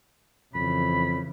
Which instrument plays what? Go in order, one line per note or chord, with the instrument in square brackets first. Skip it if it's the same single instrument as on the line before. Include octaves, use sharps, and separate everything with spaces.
[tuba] F2 [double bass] C#3 E3 [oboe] B5